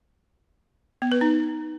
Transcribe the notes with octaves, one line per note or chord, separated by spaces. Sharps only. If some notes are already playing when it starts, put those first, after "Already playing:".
B3
B4
D#4